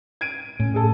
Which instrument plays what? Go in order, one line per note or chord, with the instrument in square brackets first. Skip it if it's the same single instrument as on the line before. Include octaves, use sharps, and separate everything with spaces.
[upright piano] G#6 D7 D#7
[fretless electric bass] A2 [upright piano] C#4
[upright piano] G#4 A4